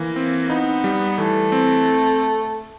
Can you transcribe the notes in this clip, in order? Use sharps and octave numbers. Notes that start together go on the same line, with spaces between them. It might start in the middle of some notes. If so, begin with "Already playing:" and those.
Already playing: E3 A#3
C4
B3 D#4
G3
E3 A3
C4